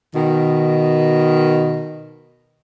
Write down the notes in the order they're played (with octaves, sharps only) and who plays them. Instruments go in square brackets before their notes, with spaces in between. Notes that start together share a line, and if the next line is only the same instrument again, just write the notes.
[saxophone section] B2 D#3